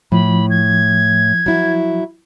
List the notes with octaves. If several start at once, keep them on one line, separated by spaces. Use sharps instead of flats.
A2 F3 B5
G#6
F#3 E4